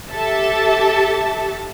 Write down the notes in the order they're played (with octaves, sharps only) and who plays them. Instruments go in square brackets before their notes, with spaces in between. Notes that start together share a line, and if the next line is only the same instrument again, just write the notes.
[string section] G4 A4 E5 A5